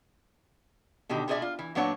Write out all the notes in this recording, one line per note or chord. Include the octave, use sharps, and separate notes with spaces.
B2 D3 D#3 G4
B2 F4 G#4 C5 D5 E5
F4
E3
A#2 F#3 B3 D4 C#5 F#5